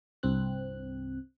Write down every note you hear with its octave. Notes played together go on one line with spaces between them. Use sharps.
C2 G2 C4 F#6